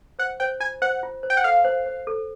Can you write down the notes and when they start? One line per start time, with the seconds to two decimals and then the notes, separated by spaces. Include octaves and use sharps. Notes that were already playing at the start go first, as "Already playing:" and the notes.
0.19 C5 F#5
0.40 C5 G5
0.60 F4 G#5
0.82 C5 F#5
1.03 F4
1.23 C5
1.30 G5
1.37 F#5
1.44 A4 F5
1.65 C5
1.86 C5
2.07 A4